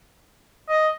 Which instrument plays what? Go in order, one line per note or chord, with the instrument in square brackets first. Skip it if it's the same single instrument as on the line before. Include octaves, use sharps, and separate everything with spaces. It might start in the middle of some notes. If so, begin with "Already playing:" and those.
[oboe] D#5